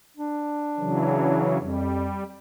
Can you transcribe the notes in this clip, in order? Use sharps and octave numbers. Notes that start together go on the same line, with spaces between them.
D4
C#3 E3 F#3
F2 G3